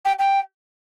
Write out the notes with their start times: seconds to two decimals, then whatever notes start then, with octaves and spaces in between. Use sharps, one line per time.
0.05 G5
0.19 G5